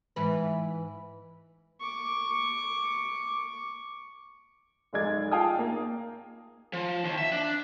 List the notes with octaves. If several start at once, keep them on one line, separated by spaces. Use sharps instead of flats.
G#2 E3 B4
C#6 D6
F1 B1 G#2 G#3 D5 G#6
F4 G#4 F5 G5 A5 D#6
A#3
F3
D#2
E5
D4